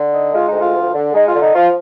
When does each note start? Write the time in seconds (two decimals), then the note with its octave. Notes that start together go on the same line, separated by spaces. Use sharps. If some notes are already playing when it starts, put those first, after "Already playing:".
Already playing: D3
0.12 D#4
0.32 G#3 F4
0.46 D#4
0.52 D2
0.59 F4
0.73 F3
0.93 D3
1.12 G#3 D#4
1.26 F4
1.33 D3
1.40 D#4
1.53 F3 F4